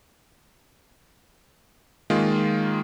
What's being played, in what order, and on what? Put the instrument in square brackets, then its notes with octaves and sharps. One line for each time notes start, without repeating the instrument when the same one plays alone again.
[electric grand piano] D#3 G#3 A#3 F4